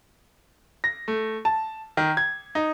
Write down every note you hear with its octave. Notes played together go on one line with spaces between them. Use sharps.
A#6
A3
A5
D#3
G#6
D#4